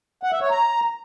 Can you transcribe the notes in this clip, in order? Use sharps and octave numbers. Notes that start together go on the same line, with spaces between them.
F#5
E5
C#5
A#5